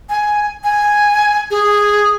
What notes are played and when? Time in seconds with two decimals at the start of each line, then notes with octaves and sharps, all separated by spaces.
0.09 G#5
0.64 G#5
1.51 G#4